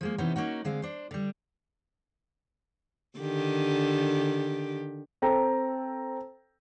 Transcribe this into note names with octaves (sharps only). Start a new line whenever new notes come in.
F3 G#3 A#3
C3 E3 B3 C#4 D#4 C5
A#3 C#4 D#4 F#4
D3 G#3 C4 F5
D4 C5
D3 G3
D3 D#3 G4
C4 A4 G5 A#5